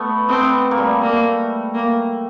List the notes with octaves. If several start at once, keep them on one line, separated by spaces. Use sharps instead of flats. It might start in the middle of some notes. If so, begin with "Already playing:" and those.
Already playing: A3 B3
A3 B3 C4
A#3
G3 A3
A#3
A#3